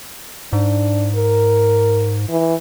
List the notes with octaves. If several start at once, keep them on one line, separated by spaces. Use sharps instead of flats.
G#2 D4
A#4
E3